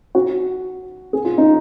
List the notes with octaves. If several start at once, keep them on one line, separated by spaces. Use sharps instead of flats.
F#4
G#4
F4
D#4